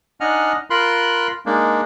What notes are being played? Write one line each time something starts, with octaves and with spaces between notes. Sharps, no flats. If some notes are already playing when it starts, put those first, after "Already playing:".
D4 D#4 D#5 F#5 G#5 F6
F4 A#4 B5 C6 F#6
G#3 A#3 D4 D#4